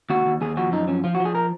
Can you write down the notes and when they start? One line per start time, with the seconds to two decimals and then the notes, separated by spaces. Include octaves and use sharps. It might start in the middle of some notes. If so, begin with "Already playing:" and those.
0.10 D#2 F#4
0.26 D#2
0.41 D#2 G#4
0.57 F3 F#4
0.72 F#2 D#4
0.88 F3 C#4
1.04 F3 F4
1.15 F#4
1.20 F3
1.25 G#4
1.35 A#4